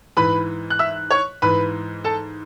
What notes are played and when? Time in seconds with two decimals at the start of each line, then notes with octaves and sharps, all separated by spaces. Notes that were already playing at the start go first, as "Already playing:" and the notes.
0.17 G#2 E3 B4 B5
0.70 F#6
0.79 E5 E6
1.11 C#5 C#6
1.42 G#2 E3 B4 B5
2.04 A4 A5